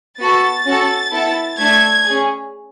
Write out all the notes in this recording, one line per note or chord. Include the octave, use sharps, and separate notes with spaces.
B3 F#4 A4 A6
C#4 F#4 A4
B3 E4 A4
A3 D4 A4 G#6
C#4 G#4